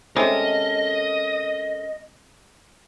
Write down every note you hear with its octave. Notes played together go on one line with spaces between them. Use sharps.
C3 G#3 C#4 A4 A#4 D#5